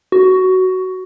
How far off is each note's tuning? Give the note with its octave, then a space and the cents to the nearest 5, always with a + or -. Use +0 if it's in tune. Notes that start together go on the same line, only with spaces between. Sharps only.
F#4 +10